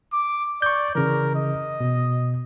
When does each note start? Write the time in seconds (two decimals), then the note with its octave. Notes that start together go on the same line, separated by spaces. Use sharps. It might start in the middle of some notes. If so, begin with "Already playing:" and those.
0.13 D6
0.62 D5 C#6 G6
0.95 C#3 E3 A#4
1.36 D#5
1.80 B2